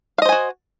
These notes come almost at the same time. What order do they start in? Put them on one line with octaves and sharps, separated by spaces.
F5 D#5 C5 G#5 F#4